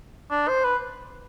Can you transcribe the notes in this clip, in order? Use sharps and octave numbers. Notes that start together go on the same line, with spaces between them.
D4
C5
B4